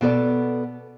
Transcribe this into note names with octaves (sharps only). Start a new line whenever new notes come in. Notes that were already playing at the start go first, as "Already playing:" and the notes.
B2 B3 A4 D5